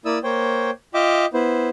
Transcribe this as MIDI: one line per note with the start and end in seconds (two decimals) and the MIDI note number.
0.05 0.19 58
0.05 0.19 64
0.05 0.19 74
0.05 0.19 87
0.05 0.19 88
0.24 0.70 58
0.24 0.70 72
0.24 0.70 73
0.24 0.70 79
0.94 1.26 65
0.94 1.26 75
0.94 1.26 76
0.94 1.26 79
0.94 1.26 86
1.34 1.69 59
1.34 1.69 64
1.34 1.69 72